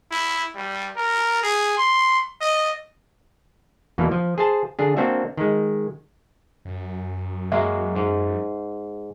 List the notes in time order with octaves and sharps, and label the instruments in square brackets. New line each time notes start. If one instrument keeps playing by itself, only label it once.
[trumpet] E4
G3
A#4
G#4
C6
D#5
[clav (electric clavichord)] E2 B2 E3 A#3
F3
G#4 C5 A5
D3 D4 G#4
A#3 C4 D4 F#4 E5
D#3 G#3
[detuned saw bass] F#2
[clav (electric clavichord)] F#3 G#3 A#3 [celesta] E5
[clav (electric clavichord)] G#2